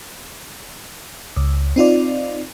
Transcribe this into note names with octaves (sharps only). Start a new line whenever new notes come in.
C#2
C4 D#4 F4 D5